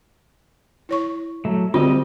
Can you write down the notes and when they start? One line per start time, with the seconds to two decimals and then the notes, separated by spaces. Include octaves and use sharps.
0.89 E4 C#5 C#6
1.45 F#3 A3
1.74 D3 G3 C4 F4 F#4 D#5